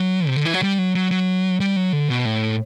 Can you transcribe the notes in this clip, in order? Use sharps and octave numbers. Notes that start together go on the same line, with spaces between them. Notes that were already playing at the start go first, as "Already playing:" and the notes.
Already playing: F#3
C3
D3
E3
F#3
G3
F#3
F#3
F#3
G3
F#3
D3
B2
A2